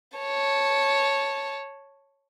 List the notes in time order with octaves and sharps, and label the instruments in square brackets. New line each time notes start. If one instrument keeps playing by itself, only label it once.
[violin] C#5 A5